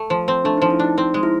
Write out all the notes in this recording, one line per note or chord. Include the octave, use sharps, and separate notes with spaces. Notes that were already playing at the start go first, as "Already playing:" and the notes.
Already playing: A3
F3
C4
A3 D4
D#4
F3
E4
D4 D#4
C4 D#4
G#3
E4